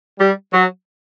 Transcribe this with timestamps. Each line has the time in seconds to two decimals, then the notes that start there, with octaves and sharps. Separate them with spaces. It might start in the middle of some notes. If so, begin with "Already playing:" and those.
0.18 G3
0.51 F#3